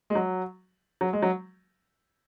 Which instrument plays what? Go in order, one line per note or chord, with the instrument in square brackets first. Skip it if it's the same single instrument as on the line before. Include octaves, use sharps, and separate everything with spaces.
[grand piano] G#3
F#3
F#3
G#3
F#3